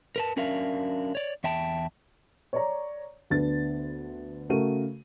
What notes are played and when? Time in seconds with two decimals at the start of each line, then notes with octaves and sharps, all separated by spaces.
0.16 A#4 B4 A5
0.36 F#3 C#4 D4 A#4 E5 F5
1.15 C#5 D5
1.44 E2 E5 G5 A5
2.53 C#5 D5 A#5
3.30 D2 B3 D4 A6
4.49 C#3 A3 F#4 A#4 D#7